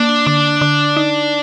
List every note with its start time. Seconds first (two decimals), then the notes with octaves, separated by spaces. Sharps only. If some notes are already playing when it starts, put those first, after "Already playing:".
Already playing: A#3 D4
0.27 D3
0.61 D3
0.96 D#4